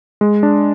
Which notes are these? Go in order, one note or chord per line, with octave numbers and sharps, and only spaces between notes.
G#3
D4